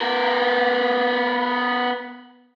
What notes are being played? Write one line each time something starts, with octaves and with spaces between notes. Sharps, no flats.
B3 A#4